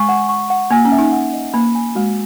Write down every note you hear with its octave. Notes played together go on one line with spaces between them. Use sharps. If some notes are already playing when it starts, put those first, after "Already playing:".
Already playing: G#3 G#5 C#6
F#5
C#6
F#5
A#3 G#5
C#4
E5
D#4
F#5
D#5
A#3 B5
G#5
G#3 F#4